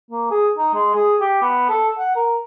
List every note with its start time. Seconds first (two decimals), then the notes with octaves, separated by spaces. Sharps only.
0.10 A#3
0.31 G#4
0.58 D#4
0.74 G#3
0.95 G#4
1.20 G4
1.42 B3
1.69 A4
1.98 F#5
2.16 A#4